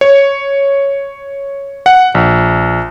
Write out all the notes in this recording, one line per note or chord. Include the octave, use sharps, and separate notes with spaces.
C#5
F#5
A#1